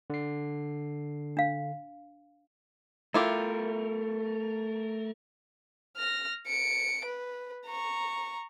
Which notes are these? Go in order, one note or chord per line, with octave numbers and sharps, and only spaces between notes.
D3 C7
D4 F5
A3 E4 F4 G4 A#4
F6 A#6
C#7 D7
B4
A#5 C#6